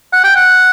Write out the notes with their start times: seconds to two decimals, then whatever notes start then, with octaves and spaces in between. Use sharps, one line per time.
0.13 F#5
0.24 G5
0.36 F#5